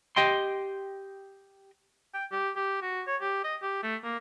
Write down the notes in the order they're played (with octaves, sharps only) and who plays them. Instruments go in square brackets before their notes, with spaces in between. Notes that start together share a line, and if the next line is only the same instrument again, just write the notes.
[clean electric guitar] G4 D#5 G5 C6
[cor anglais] G5
G4
G4
F#4
C#5
G4
D#5
G4
A3
A#3